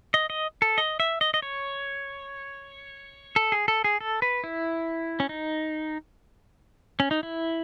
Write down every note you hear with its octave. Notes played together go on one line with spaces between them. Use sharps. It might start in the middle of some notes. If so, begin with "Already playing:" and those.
D#5
D#5
A4
D#5
E5
D#5
D#5
C#5
A4
G#4
A4
G#4
A4
B4
E4
C#4
D#4
C#4
D#4
E4